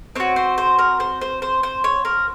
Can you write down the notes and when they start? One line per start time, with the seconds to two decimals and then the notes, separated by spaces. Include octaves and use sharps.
0.16 C4 F#4 C#5
0.36 C5
0.58 C5
0.79 A#4
1.00 C5
1.21 C5
1.42 C5
1.63 C5
1.84 C#5
2.05 A#4